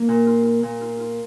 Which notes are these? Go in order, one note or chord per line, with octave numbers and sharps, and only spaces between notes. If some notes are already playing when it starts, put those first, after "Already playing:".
Already playing: A#3
A#2
F4
F4
A#2
F4
F4